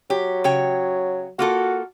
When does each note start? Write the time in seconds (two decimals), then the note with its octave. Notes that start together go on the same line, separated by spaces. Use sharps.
0.10 F#3 G4
0.44 C#3 C#5 G5
1.39 A#3 F4 F#4 A4